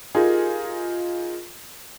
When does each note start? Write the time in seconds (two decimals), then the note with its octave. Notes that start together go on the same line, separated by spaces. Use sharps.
0.15 D#4 F4 G4 G#4 A#4 G#5